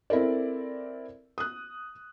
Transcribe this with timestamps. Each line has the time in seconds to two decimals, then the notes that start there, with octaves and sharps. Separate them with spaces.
0.10 C4 E4 A4 A#4 D5
1.38 D#6 F#6